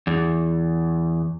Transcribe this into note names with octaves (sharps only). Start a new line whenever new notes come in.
E2